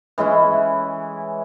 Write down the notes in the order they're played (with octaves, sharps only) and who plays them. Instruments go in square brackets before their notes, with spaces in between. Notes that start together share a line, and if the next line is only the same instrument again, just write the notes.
[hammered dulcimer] E3 G#3 C#4 E4